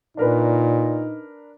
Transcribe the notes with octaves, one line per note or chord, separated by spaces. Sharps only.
A#2 D4 D#4 A#4 B4